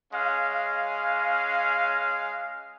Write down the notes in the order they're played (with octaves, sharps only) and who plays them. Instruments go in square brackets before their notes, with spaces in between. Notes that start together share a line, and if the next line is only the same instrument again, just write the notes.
[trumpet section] G#3 C#4 F5